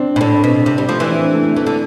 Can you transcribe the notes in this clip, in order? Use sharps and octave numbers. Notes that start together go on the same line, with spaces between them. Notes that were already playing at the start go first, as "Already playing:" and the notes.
Already playing: C4 D4
B2
A2 D4
B2 C4
C3
G3 C4
F3 A3
E3
D4
C4
A3
A3
E3 A3
D3